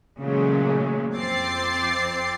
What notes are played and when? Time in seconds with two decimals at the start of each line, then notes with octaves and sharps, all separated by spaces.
0.19 A#2 C#3 E3 F#3 G#3 A3
1.14 F2 C4 D6 A6 C7